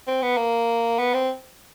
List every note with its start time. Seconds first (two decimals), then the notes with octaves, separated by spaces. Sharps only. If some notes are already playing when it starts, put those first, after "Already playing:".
0.07 C4
0.22 B3
0.37 A#3
0.99 B3
1.14 C4